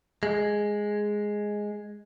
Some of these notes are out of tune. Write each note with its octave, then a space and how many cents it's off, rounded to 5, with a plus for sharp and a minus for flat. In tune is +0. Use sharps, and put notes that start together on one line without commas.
G#3 +0